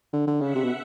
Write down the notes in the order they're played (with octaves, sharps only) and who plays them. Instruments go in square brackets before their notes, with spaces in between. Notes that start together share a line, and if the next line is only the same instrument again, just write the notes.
[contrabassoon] D3
D3
[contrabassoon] C#3 [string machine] E5 F#5
[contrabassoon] C3
B2